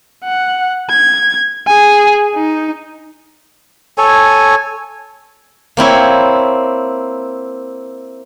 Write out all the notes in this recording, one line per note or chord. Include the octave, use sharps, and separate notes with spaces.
F#5
G#6
G#4 G#5
D#4
A4 C#5 G#5
A#3 C4 E4 C#5